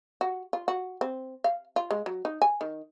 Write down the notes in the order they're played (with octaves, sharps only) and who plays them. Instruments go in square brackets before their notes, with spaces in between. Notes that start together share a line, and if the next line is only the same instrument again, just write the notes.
[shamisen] F#4
F4
F#4
C4
F5
F4
G#3
F#3
D#4
G#5
D#3